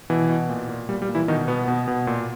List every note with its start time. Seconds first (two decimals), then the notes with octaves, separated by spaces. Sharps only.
0.10 B2 E3
0.29 B2
0.49 A#2
0.69 A#2
0.89 A#2 G3
1.02 G3
1.08 A#2
1.15 E3 E4
1.28 B2 D#3 D#4
1.48 B2 B3
1.68 B2
1.88 B2
2.07 A#2